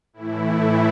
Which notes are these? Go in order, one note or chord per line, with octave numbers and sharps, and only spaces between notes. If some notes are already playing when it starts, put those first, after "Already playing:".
A2 E3 A3 E4